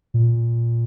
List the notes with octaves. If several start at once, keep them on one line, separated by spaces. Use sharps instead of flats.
A#2